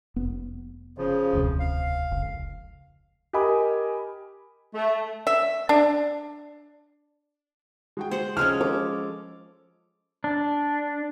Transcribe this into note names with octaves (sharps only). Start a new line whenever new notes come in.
F1 B3
C#3 F3
E1 D2 C3
F5
F1 C#2
G4 A#4 D#5 G#5 B5 D#6
A3
E5
D4
G#3 F#4 G5
C5 F#5 C6
F3 G#3 C#4 F6
A4 D6
D4